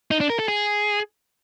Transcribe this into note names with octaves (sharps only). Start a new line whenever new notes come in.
D#4
D4
A#4
A4
G#4